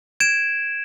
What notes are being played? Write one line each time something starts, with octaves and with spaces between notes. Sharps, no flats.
G#6 D7 E7